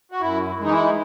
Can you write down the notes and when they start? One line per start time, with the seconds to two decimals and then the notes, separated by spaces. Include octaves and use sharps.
0.12 F#4
0.21 F#2 E4
0.60 E3 G#3 D#4
0.72 E4